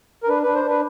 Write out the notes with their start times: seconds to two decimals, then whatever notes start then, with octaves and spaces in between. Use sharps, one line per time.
0.23 A#4
0.29 D4 B4
0.43 D4 B4
0.55 C5
0.65 D4 B4